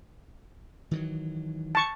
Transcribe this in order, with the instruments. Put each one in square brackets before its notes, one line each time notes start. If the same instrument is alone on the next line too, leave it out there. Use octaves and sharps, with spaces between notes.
[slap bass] D#3 E3 F#3
[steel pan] A5 C#6